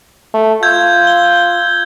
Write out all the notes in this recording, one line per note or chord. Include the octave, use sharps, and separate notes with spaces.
A3
F4 E6 G6 G#6
G7